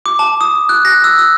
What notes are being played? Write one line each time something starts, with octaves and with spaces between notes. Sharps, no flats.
D6
A5
D#6
F#6
A#6
E6
E6